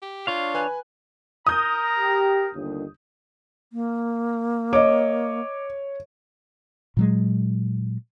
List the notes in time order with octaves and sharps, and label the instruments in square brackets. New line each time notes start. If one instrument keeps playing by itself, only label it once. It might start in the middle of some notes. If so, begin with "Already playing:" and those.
[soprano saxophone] G4
[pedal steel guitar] D4 C#5 F5 [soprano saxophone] F4
[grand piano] B4 G#5 F#6
[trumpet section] A#4 A#5 [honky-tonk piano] D#6 G6
[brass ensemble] G4
G1 D#2
[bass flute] A#3
[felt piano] C#5 [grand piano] D#5 D6
[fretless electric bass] A#2 F#3 G#3